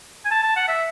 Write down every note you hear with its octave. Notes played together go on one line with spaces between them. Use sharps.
G#5
A5
A5
F#5
E5